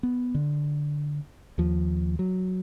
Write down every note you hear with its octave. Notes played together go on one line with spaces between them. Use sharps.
B3
D3
D#2 F3
F#3